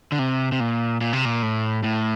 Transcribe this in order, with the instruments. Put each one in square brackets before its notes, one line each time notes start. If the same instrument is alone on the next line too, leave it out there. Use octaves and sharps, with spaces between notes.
[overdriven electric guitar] D3
C3
C3
A#2
A#2
C3
A#2
A2
A2